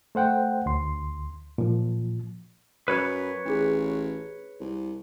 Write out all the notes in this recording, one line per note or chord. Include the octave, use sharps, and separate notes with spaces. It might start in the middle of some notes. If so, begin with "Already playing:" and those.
A3 C5 F#5 G5
D2 C6
A#2 F3
F#2 B4 C#5 D#5 B5
A1 D4 G#4
C2